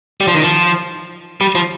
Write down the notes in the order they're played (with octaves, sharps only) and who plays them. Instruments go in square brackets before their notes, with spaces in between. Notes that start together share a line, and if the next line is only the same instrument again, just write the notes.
[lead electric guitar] G3
F3
D#3
F3
G3
F3